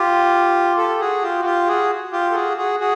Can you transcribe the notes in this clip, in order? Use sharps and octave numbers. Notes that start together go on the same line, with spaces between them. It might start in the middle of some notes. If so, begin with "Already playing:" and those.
Already playing: F4 G4
G4 A4
F#4 G#4
F4 G4
F#4
F4 G4
F#4 G#4
F4 G4
A4
F#4 G#4
F#4 G#4
F#4 G#4